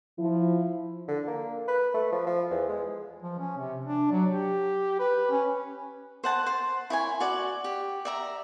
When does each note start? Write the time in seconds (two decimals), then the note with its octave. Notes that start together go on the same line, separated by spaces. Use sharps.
0.19 F3 E4
1.08 D3
1.27 A#3
1.68 B4
1.94 A3
2.12 F3
2.26 F3
2.51 E2
2.68 G#3
3.22 F3
3.38 C#4
3.58 C3
3.85 D4
4.11 F#3
4.31 G4
4.99 B4
5.31 C#4
6.24 C5 F#5 A5
6.46 C5
6.90 E4 C#5 G#5
7.20 F#4 D5
7.64 G4
8.05 D5 E5 A#5